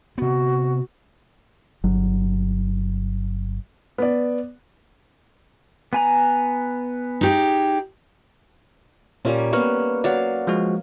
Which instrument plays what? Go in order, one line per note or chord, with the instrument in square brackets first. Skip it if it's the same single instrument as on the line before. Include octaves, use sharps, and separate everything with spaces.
[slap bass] C3 B3 [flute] F#4
[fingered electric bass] G1 F#3
[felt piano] B3 D5
[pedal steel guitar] B3 G#5 A#5
[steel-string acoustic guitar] D#4 G4 G#4
[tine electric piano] A#2 [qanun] G3 A#3 C#4
[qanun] A#3 B3 [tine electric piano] C#6 F6
[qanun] F#3 F5 [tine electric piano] D5 F#5
[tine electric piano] F3 G#3 F#4